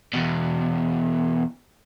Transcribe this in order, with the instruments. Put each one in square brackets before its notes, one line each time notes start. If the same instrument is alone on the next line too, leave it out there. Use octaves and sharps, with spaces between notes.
[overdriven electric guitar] E2 B2